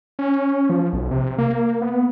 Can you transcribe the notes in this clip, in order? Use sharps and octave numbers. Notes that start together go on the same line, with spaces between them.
C#4
F3
B1
C3
A#3
B3